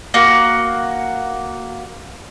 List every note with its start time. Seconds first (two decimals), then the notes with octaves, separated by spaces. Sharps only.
0.14 A#3 F#4